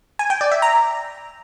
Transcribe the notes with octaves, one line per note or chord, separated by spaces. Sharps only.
G#5
G5
D5
E5
A#5